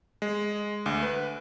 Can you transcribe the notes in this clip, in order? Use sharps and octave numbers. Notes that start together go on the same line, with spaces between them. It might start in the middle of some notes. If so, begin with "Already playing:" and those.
G#3
D2
B4